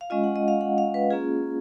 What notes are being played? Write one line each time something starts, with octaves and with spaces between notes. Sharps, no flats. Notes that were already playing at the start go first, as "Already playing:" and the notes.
F5
G#3 C#4 F4 D#5
F#5
D#5
F5
F#5
F5
B4
A#3 C#4 F4 G#4